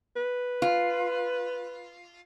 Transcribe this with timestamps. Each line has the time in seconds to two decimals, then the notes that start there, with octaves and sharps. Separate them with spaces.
0.16 B4
0.62 F4